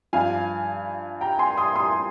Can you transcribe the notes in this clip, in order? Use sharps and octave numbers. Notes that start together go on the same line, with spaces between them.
G2 F3 F5 G#5
G5 A#5
G#5 C6
C6 D#6
C6 D#6